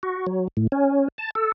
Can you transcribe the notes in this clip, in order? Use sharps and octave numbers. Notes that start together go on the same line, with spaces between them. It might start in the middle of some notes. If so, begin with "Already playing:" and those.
F#4
F#3
A2
C#4
A5
A4